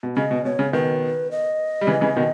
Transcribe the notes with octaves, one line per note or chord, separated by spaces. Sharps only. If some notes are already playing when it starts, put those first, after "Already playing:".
B2
C#3 D#5
B2
B2 C#5
C#3
B2 D#3 B4
D#5
G3
C#3 E3
C#3 E3
B2 D#3